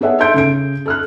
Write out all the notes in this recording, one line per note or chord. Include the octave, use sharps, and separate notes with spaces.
B3 G#4 A4 C#5 E5 F#5
A4 E5 C6 G6 D7
C#3 D7
A4 F6 F#6